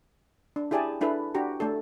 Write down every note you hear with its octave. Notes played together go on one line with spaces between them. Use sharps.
D4
E4 G4 G#4 D5 G#5 A5
D4 E4 A4 B4
D4 F#4 G4 A#5
A3 D4 A4